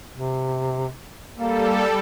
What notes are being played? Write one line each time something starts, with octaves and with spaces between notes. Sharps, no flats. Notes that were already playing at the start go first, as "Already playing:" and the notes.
C3
G3 A#3 A4